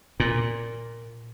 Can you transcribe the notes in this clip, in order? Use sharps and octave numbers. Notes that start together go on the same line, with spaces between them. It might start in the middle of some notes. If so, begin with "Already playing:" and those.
A#2